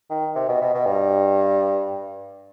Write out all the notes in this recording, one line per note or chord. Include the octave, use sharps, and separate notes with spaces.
D#3
C3
B2
B2
B2
G2